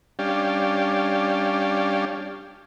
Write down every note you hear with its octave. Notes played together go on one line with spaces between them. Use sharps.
G3 C#4 D4 G4 D5 F5